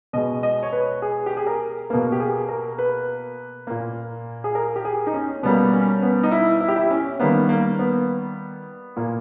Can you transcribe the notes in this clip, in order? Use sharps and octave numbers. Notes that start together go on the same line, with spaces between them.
B2 G#3 D#5
D#5
C#5
B4
G#4
G4
G#4
A#4
B2 A#3 B4
G4
G#4
A#4
B4
A#2 A#3
G#4
A#4
G4
G#4
D#4
C#4
B2 G3 A#3 B3
C#4
B3
D#4
E4
E4
G4
E4
C#4
D#3 G3 A#3 B3
A#3
B3
A#2 A#3